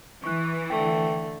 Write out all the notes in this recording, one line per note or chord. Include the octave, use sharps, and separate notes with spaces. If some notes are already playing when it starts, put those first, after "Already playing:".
E3 C#6 F#6
D3 A3 G5